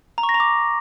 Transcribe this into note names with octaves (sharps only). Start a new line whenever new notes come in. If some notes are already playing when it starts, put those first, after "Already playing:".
A#5
C#6
A#6
A#5
D6